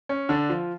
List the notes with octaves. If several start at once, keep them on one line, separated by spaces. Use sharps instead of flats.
C#4
D3 D4
F3 F4